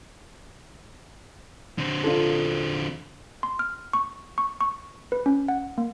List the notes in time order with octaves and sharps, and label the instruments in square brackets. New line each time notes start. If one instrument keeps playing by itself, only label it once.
[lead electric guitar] D3 C4
[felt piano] D4 F4 A4
[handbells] C6
F6
C#6
C#6
C#6
B4
C#4
F#5
A#3